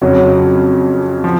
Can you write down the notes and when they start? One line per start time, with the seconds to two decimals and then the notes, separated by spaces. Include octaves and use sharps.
0.01 F2 C#3 F#3 C#4
1.24 F3